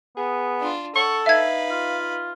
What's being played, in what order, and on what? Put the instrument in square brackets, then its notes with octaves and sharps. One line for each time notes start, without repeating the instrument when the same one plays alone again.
[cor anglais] B3 [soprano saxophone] G#4
[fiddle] D4 F4
[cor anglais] A4 [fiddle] F#5 [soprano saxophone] C#6
[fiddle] D#4 B4 [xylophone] E5 G#6 [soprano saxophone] F5
[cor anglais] F4